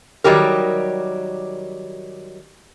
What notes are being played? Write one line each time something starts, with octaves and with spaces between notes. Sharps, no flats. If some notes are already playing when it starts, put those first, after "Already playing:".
D#3 F#3 G3 G4 A#4